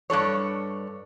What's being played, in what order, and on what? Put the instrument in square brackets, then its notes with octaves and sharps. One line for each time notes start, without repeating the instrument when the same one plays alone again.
[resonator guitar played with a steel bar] G2 D4 A4 C#5